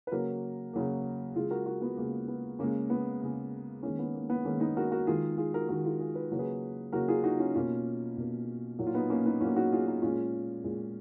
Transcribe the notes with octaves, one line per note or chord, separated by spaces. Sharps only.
B4
C#3 F#3 A#3 F#4 A#4
C#3 F#3 A#3
C#3 G#3 F4 G#4
F#4 A#4
F#4 A#4
B3
C#3 G#3 A#3
B3
C#3 G#3 A#3 C#4
B3
C#3 G#3
D#3 G#3 A#3 C#4
B3
A#3
B3
D#3 G#3 A#3 C#4
B3 D#4
F#4 A#4
F#4 A#4
D#3 G#3 F4 G#4
F4 G#4
F#4 A#4
D#3 G#3 F#4 A#4
F4 G#4
F4 G#4
B4
C#3 F#3 A#3
G#4 B4
C#3 F#3 A#3 F#4 A#4
F4 G#4
D#4 F#4
C#4 F4
B2 A#3 C#4 F4
B2 A#3
A#2 F#3 A#3
F4
B3 D#4
A#3 C#4
B3 D#4
A#2 F#3 A#3 C#4 F4
D#4 F#4
F4 G#4
D#4 F#4
A#2 G#3 C#4 F4
A#2 G#3